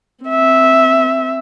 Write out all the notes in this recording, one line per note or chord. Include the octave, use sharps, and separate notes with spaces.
C4 E5